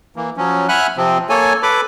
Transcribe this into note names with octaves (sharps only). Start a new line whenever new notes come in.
E3 A#3
F3 F#3 C#4
E5 F#5 G#5 B5 F6 F#6
C3 F3 C4
A#3 A4 C#5 G#5
A4 B4 B5 D6